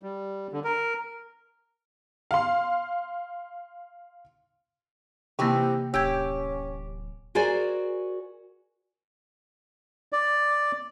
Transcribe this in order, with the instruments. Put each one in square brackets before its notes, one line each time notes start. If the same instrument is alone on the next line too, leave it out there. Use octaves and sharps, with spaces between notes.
[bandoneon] G3
D3
A#4
[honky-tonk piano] F5 C6
[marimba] C3 A#3 [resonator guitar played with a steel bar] E3 C4 D#4 [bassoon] G4
[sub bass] D1 [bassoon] C#4 [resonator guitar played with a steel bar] G4 [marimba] E6 G6 G#6
[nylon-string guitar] F#4 G#4 A#4 C5 D5 G#5
[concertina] D5